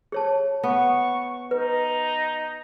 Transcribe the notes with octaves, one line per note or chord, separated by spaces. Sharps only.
G#4 C#5 A5
B3 C#6
D#4 B4